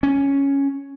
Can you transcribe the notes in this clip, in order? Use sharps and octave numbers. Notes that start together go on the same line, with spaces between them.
C#4